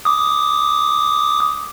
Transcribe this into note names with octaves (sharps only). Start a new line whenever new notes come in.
D6 D#6